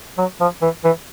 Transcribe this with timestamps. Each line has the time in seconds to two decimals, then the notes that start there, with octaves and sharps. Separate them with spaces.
0.18 F#3
0.40 F3
0.62 E3
0.84 E3